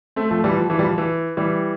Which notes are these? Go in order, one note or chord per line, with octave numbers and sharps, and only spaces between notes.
A3 C4
F3 A3
E3 G3
F3
E3
G3
F3
E3
E3 G3